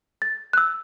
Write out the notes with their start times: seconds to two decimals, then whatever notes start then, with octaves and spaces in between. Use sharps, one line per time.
0.22 A6
0.53 F#6
0.57 E6